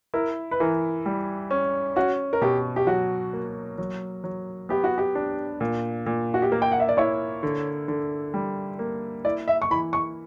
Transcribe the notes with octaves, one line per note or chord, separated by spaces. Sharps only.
E4 A#4
B4
E3 A#4
G3
C#4
C#4 F#4
A#4
B2 G4
G4
F#3 F#4
A#3
F#3
F#3
B3 G4
F#4
G4
D4
A#2
A#2
F#4
G4
A#3 A#4
G5
F#5
E5
D5
E4 C#5
D3
D3
G3
A#3
E4 D5
E5
C#6
E3 B5
C#6